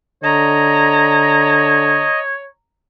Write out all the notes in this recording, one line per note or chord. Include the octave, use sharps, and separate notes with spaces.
D3 C#5 D#5 A#5